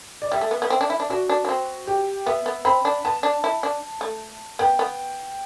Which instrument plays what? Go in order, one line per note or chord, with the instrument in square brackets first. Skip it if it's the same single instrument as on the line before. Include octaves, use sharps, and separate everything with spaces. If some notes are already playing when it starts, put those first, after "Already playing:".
[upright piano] D5
[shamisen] G3 [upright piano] E5
[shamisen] A3
B3
B3
C4
D4
E4
D4
[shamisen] D4 [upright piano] F#4
[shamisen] D4
D4
C4
[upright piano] G4
[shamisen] B3 [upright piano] E5
[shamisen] B3
[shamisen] C4 [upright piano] B5
[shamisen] D4
[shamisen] B3 [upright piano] A5
[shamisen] D4
E4
D4
A3
[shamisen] B3 [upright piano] G5
[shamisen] B3